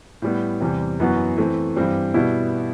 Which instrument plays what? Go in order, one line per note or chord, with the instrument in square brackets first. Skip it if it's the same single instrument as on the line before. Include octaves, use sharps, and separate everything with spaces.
[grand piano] A2 G3 B3
E2 C3 E3 G3
F#2 E3 B3 F#4
E3 A3 C4
G2 E3 G3 C4
B2 G3 B3 E4